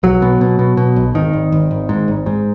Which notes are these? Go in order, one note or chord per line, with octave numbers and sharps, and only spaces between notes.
B1 F#3
B2
B2
B2
B2
B1
G#1 D#3
G#1
G#1
G#1
G#2
G#1
G#2